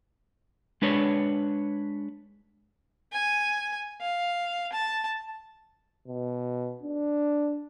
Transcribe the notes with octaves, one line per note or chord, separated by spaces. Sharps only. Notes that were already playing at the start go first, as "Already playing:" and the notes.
G#3 D4 B4 C#5
G#5
F5
A5
B2
D4